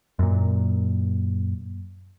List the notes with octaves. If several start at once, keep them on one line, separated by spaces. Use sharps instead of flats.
F#2 A#2